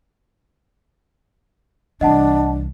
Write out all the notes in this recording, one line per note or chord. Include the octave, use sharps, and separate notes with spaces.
C2 E3 D4 D#5 F#5 A5